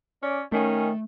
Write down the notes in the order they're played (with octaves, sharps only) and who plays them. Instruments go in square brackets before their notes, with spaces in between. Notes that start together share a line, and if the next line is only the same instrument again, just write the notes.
[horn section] C#4 D5
[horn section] D#3 C#4 [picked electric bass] A3